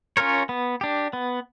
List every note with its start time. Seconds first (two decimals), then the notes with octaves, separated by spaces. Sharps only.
0.17 C#4 F4 A#4 C#5
0.49 B3
0.81 D4 G4
1.13 B3